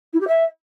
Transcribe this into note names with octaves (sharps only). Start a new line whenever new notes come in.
E4
G4
E5